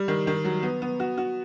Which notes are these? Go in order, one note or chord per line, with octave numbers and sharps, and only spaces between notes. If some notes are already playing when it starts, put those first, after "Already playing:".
Already playing: G3
D#3
D#3
F#3
B3
B3
F#4
F#4